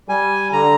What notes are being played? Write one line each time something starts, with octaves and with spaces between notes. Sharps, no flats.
G3 G#5
D3 A#5